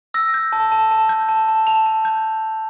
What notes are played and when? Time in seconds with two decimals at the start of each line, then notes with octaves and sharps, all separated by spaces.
0.14 E6 A#6
0.34 G6
0.52 A5
0.72 A5
0.91 A5
1.09 G6
1.29 A5
1.48 A5
1.67 A5 F7
1.86 A5
2.05 G6